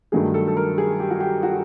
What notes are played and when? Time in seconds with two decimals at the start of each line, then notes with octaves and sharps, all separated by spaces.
0.12 G2 D#3 F#3 A3 G#4
0.34 A4
0.48 A4
0.57 A#4
0.78 G#4
1.00 G4
1.10 F#4
1.20 G4
1.43 F#4